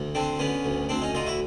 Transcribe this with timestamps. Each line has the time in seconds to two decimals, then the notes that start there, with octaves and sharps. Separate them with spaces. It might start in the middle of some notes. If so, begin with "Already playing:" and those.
Already playing: D2
0.15 D3 C4 D4
0.39 D3 B3 C#4
0.65 D2
0.89 D2 C4 D4
1.02 C#4 D#4
1.15 D3 D#4 F4
1.27 E4 F#4